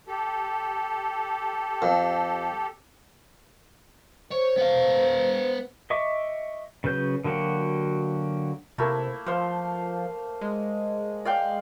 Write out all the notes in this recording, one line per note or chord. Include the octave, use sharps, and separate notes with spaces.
G4 A4
F2
C5 C#5
B3 F5
D#5 E5 C#6 D6
C#3 F#3 B4 G6
D3 F#3 A#3 F#4 G4
C3 A3 A#3 E4
F3 C5 F5
G#3
D5 F5 G5